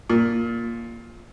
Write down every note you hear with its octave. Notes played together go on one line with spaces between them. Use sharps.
A#2